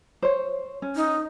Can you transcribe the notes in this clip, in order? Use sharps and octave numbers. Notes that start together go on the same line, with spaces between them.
C5 C#5
C#4
D#4